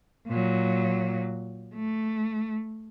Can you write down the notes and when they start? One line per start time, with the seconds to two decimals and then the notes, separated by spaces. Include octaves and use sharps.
0.27 A#2 F#3
1.75 A3